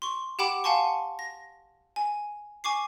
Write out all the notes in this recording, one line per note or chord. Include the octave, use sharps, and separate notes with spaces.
C6 C#6
G4 F#5 G5 B5 D6 E7
F5 F#5 G#5 A5 C6 C#6
A#6
G#5
G#5 C#6 D6 C7